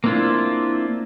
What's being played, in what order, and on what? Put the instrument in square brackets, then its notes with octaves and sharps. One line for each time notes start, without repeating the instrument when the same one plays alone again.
[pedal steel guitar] A#3 C4 D4 E4 F4